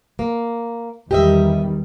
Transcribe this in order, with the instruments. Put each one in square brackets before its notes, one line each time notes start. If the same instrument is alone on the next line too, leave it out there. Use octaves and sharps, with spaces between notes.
[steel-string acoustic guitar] A#3
[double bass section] E2 D#3 G3 [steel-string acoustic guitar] G4 D#5 E5